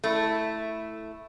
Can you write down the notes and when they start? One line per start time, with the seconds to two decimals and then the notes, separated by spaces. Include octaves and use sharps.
0.04 A3 E4